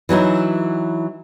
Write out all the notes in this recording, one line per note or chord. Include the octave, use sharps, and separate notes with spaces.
E3 F#3 D#4 E4